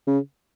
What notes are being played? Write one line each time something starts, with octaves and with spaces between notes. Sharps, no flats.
C#3